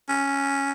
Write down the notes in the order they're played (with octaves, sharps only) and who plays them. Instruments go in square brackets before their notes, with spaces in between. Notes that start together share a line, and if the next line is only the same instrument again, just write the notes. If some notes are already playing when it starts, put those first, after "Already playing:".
[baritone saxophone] C#4